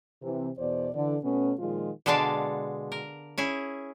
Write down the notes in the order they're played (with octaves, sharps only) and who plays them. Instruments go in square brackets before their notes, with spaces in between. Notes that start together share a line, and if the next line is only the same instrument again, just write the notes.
[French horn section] C3 E3
E2 B2 C5 D5
D3 E3 D5
B2 A3 B3 C#4
A#2 D#3 F3 G#3 F4
[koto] B2 D3 G#3 D4 F5 A5
A#4
C#4 E4 G#4